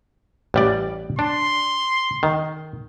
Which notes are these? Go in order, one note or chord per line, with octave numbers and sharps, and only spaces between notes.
A1 G3 D5
D4 C6
D#3